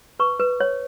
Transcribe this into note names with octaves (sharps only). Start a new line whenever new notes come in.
B4 C#6
B4
C#5